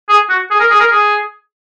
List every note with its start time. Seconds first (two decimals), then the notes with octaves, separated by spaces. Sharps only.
0.09 G#4
0.30 F#4
0.51 G#4
0.60 A#4
0.71 G#4
0.80 A#4
0.91 G#4